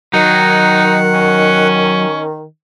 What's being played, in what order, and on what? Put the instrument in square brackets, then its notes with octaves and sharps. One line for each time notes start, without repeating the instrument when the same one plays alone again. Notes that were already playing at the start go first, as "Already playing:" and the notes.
[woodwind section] D#3 [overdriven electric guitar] F#3 [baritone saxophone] D#4 [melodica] F#5
[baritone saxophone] C#4